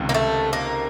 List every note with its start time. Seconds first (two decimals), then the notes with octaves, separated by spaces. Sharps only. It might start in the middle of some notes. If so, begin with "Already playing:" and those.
Already playing: C#2 C3 D#3
0.09 A#3
0.14 A3
0.53 A#3